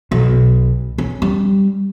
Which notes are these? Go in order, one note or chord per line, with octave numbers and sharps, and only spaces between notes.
B1
C#4
G3